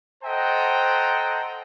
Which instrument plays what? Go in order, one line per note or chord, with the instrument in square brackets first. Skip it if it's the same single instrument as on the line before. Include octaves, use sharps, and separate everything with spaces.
[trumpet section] A4 C5 D#5 F#5 G5 A#5